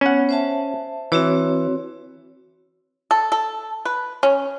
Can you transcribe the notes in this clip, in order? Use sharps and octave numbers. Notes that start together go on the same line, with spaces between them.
B3 C#4 F#5
C5 E5 A5
E3 C4 F#4 C#5
A4
A4
B4
C#4